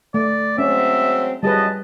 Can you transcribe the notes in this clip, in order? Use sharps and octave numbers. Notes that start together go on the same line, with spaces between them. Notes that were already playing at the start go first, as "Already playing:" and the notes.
A3 D5
F#3 G#3 C4 C#4 E5
F#2 F3 G3 G#4 B4 D#5 A5